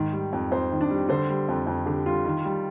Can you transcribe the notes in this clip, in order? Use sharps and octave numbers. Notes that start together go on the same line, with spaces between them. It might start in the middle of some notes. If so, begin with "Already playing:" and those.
Already playing: G#2 D#3
G3
F2
F2 C5
D#3
D4
G3
D3 C5
G3
F2
F2
D3 G4
G3 F4
D#3
G3